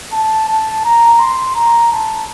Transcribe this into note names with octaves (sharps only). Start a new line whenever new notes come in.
A5
A5
A#5
C6
A#5
A5